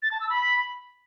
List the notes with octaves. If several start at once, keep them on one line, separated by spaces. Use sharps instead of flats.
A6
A5
E6
B5